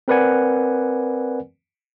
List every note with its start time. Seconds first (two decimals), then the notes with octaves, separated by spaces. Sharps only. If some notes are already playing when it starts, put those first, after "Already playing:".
0.08 C4 A#4 B4 D5 F#5 G#5